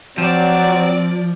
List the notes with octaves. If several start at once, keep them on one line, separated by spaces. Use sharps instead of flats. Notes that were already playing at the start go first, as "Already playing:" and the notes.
F3 F#3 C4 D5